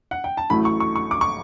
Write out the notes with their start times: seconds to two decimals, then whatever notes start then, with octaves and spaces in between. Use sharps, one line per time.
0.11 F#5
0.24 G5
0.37 A5
0.50 A1 A2 F#3 A3 B5
0.65 C#6
0.80 C#6
0.96 C#6
1.11 D6
1.21 C#6